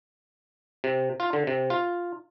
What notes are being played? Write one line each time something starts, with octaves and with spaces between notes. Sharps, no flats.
C3
F4
D3
C3
F4